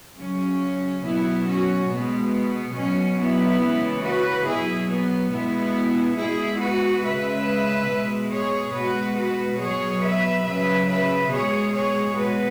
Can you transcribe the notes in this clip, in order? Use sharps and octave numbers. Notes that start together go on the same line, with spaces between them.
C#3 F#3 C#4
B2 F#3 B3 E4
C#4 F#4
B2 G#3 B3
B2 F#3 C#4
B3 E4
C#3 E3 G#3
F#4 B4
B2 F#3 E4 G#4
B3
B2 G#3 B3 E4
B2 G#3 E4 G#4
F#4 B4
C#3 G#3 B4 E5
B2 G#3
G#4 C#5
B2 G#3 F#4 B4
F#4 B4
B2 F#3 G#4 C#5
B4 E5
C#3 F#3 B4 E5
B4 E5
B2 G#3 G#4 C#5
G#4 C#5
B2 G#3 F#4 B4